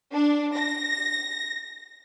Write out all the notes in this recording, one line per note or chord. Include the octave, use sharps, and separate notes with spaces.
D4
A#6